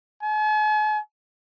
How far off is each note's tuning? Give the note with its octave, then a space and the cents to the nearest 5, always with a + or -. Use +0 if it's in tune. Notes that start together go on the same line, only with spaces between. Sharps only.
G#5 +45